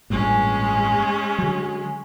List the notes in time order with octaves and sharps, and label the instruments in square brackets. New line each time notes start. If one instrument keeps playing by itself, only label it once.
[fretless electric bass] A1 G2 A#2 [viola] G#3 C#4
[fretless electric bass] D3 F#3